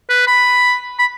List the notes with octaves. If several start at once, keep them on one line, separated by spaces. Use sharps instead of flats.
B4
B5
B5